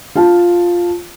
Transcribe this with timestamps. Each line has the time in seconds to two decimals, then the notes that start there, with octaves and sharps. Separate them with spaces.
0.15 F4 A5